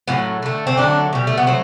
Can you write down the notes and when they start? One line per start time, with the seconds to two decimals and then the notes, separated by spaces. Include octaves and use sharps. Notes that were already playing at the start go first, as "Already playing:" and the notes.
0.07 A2 F#3 A3 B3
0.42 D3 A3
0.67 C4
0.77 D3 F#3 A3 D4
1.13 B2 G3
1.27 A3
1.37 B3
1.47 F#3 A3 C4